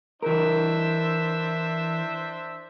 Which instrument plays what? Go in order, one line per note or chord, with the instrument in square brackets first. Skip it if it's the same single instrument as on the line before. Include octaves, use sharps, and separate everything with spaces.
[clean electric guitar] E3 A#4 [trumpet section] D4 C5 E5